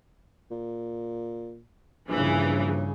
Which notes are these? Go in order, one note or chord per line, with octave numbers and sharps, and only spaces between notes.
A#2
A#1 G2 C#3 E3